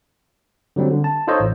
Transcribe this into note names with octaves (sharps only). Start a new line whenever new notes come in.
D3 F#3 G3 C4
D3
A5
D#4 F4 A4 C5 C#5 D#5
A1